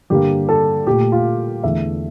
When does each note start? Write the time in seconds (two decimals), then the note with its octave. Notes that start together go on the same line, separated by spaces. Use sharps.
0.10 G2 D3 G3 A#3 G4
0.49 A4
0.87 A#2 A3 G4
1.12 F4
1.63 E2 D3 A3 E5